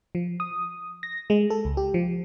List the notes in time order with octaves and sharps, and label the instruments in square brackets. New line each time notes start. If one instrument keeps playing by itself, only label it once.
[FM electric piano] F3
D#6
A#6
G#3
A4
C#2
G4
F3